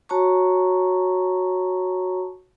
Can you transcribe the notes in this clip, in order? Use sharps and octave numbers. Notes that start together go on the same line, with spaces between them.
F#4 C#5 A5 A#5 C#6